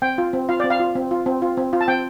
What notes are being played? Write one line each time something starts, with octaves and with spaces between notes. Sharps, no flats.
C4 G5
F4
C4
F4 F5
C4 D5
F5
F4
C4
F4
C4
F4
C4
F4
A5
C4 G5